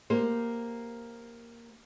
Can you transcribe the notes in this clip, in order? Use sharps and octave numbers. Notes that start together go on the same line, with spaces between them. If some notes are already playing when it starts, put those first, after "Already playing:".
A#3 G4 C5